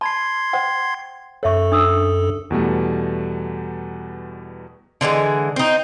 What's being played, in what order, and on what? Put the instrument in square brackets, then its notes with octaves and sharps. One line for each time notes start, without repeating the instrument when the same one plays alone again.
[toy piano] A5 B5 [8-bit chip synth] C6 G#6 C7
[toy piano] C5 F#5 G5
[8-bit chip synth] F#2 A4 [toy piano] C#5 E5 C#6
[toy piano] D4 D#6 E6
[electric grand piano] E2 B2 G3 A3
[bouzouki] D3 E3 F#3 G#3
C4 D#4